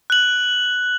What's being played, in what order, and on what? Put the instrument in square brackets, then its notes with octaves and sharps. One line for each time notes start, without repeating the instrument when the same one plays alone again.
[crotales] F#6 F#7